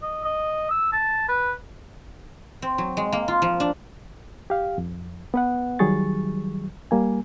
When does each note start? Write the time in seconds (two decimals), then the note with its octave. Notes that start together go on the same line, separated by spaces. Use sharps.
0.02 D#5
0.24 D#5
0.70 E6
0.92 A5
1.28 B4
2.62 C4
2.78 F#3
2.97 G#3
3.12 A#3
3.28 F4
3.42 F3
3.60 D4
4.50 G4 F5
4.78 F2
5.34 B3 B4 F#5
5.79 D#3 F#3 G3 G#4 C#6 A6
6.91 G3 A#3 G#5